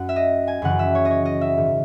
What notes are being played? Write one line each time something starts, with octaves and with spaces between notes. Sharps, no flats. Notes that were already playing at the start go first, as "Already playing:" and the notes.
Already playing: F#2 F#5
E5
D#5
G#5
F#2 C#3 E3 F#5
E5
C#5
D#5
C#5
D#5
E5
G#2 D#3